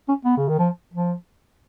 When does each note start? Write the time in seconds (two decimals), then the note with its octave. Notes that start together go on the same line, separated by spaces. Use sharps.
0.08 C#4
0.25 B3
0.37 C#3
0.49 D#3
0.59 F3
0.94 F3